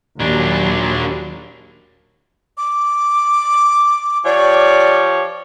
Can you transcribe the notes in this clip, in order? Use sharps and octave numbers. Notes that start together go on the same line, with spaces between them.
D#2 A#2 F#3 D4
D6
F3 G4 C#5 D5